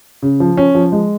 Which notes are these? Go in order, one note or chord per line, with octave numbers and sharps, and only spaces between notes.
C#3
F3
C#4
F3
G#3